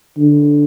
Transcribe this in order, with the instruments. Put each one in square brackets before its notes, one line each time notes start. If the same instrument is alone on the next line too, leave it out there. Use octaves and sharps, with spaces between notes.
[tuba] D3